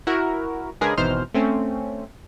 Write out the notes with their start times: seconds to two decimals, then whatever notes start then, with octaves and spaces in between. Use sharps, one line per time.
0.07 E4 F#4 A#4
0.81 C#3 G#3 D4 G#4 A#4 B4
0.97 G#1 B2 E3 D#4 C5 F6
1.34 A3 C4 C#4